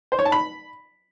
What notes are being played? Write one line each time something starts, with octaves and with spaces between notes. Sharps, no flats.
C5
C#5
A5
B5